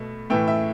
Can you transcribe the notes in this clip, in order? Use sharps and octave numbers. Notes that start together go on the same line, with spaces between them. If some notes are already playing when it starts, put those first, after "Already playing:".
Already playing: B2 A3
A2 E3 A3 G5
E5